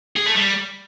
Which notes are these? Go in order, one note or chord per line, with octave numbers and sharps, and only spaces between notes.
G#4
A3
G3